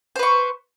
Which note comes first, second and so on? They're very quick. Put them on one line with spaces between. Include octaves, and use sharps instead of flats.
C5 B4 C#6